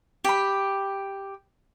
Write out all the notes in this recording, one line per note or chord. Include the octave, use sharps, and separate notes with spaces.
G4 B5